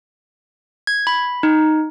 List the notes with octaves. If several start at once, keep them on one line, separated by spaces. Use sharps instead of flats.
G#6
B5
D#4